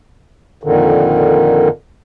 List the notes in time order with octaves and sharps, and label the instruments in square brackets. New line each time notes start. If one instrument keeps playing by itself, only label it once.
[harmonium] F2 A#2 D3 D#3